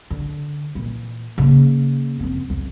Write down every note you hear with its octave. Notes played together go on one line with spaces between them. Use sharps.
D3
A#2 E3
C#3 A#3
F#2 C4
C2 F2